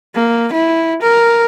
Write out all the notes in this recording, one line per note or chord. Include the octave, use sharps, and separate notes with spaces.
A#3
E4
A#4